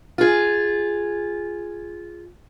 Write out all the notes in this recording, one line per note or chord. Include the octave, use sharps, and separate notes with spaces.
F4 G#4